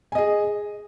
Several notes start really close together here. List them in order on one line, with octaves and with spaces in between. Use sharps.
G#5 D#5 G#4